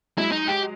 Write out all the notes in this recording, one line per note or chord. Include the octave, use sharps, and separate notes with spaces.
F#3 G#3 E4
D#4
G4